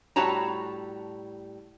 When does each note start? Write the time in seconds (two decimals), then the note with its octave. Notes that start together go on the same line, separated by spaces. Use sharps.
0.16 A2 G3 F#4 C#5 A5 A#5